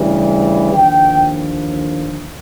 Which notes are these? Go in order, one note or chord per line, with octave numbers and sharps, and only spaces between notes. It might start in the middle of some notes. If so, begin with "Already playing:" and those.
Already playing: D2 C#3 E3 G3
D#2 D3 F3 G5